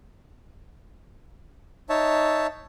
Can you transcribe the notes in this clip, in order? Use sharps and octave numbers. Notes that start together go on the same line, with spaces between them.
D#4 C#5 E5 A5